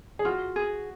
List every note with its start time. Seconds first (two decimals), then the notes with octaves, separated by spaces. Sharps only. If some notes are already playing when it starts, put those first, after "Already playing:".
0.19 G#4
0.25 F4 F#4
0.56 G#4